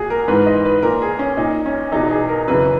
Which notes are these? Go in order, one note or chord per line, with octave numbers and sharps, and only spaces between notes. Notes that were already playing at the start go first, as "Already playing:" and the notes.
Already playing: A#2 F#4 G#4
A#4
G#2 E3 B4
D#5
B4
A#2 A#4
G#4
C#4
A#2 D#4
C#4
E2 B2 D#4
G#4
A#4
F#2 C#3 E3 B4